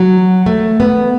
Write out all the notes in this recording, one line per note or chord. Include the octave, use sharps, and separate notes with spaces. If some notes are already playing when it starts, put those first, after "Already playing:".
Already playing: F#3
A3
B3